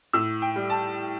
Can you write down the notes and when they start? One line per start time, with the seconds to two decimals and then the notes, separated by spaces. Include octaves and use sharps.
0.13 A2 E6
0.42 G5
0.56 G3
0.70 A5